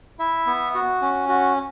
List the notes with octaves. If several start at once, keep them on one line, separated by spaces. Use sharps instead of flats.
E4 E5
B3
F#4
C#4
F#4